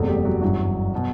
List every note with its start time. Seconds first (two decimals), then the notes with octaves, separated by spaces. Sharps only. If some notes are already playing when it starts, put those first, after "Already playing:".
Already playing: F#1 E2 C3 A3 A4
0.08 G3 G4
0.25 F#3 F#4
0.42 G1 F#2 E3 F#3 F#4
0.95 B2